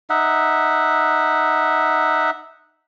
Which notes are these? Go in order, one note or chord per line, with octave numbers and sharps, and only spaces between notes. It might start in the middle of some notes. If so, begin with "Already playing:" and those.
D#4 E5 F#5